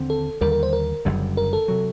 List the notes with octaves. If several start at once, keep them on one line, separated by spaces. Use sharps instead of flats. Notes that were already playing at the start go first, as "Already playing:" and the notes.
Already playing: D#2 D3 C4
A4
D#2 D3 G3 A#4
A#4
C5
A#4
F#1 F#2 D3 G3
A#4
A4
C3 F#3